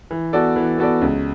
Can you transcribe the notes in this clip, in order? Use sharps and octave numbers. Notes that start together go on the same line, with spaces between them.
E3
B3 F#4 A4 D5
E3
B3 F#4 A4 D5
C#2